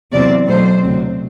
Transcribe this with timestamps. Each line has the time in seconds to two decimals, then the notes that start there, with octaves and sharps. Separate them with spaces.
0.12 E2 C3 F#3 C4 D5
0.47 B2 F#3 A3 C4 C5
0.82 D2 C3 F#3 C4